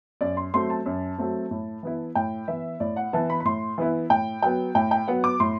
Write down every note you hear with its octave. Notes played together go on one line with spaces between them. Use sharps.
F#2 D5
C6
F#3 A3 C4 C6
A5
F#2
F#3 A3 C4
A2
E3 B3 E4
A2 G5
E3 B3 E4 E5
A2 D5
F#5
E3 B3 E4 A5
B5
B5
A2 C6
E3 B3 E4
A2 G5
F#3 B3 G5
A2 G5
G5
F#3 B3 F#5
D6
A2 C6